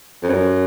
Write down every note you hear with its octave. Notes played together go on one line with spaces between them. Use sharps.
F2
F#2